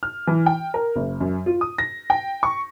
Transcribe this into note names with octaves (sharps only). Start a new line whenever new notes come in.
F6
E3
G5
A#4
F#1
F#2
F4
D#6
A#6
G5
C#6